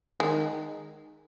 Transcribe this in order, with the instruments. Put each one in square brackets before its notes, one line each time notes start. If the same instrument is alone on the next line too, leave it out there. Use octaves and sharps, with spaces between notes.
[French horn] D#3 [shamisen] G#3